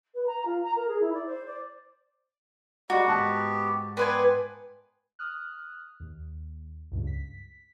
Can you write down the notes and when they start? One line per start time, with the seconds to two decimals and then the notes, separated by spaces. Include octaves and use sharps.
0.14 B4
0.26 A#5
0.45 F4
0.62 A#5
0.76 A#4
0.88 G#4
1.00 E4
1.13 D5
1.26 C5
1.46 D5
2.90 G3 G#3 F#4 D5 A#5
3.08 G#2 B3 G4 A5 F#6
3.97 B3 B4 C5 D5 G5 G#5
5.19 D#6 F6 F#6
6.00 D#2
6.92 C#2 G2
7.07 B6